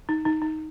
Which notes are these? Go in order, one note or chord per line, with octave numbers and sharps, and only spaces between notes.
D#4
D#4
D#4